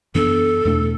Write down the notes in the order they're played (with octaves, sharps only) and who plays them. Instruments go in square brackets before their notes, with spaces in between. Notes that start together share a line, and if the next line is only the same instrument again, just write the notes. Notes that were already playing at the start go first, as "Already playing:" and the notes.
[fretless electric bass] F#2 E3 B3 D4 [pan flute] A4
[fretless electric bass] E2 B2 A3 D4